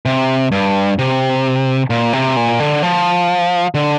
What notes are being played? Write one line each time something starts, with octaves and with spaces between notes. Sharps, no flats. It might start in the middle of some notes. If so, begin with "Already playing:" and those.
C3
G2
C3
A#2
C3
A#2
D3
F3
D3